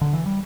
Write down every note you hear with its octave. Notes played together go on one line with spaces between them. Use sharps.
D3
E3
G3